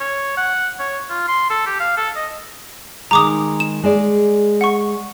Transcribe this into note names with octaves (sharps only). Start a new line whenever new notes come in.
C#5
F#5
C#5
F4
C6
A4
G4
F5
A4
D#5
D#3 G#3 A#5 D6 D#6
E7
G#3 G#4 D5
F#5 C#6